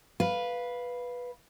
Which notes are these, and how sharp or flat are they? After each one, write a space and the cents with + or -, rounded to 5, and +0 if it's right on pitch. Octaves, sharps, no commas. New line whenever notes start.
B4 -5 F5 +0